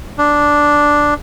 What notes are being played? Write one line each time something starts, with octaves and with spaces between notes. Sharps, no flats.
D4